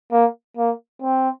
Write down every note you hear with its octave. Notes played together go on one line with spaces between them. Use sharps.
A#3
A#3
C4